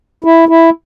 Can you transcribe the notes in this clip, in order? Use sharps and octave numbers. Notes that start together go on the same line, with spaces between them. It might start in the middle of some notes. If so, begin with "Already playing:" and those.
E4
E4